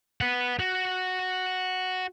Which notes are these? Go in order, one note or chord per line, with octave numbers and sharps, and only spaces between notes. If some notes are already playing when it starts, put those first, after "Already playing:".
B4 F#5
F#4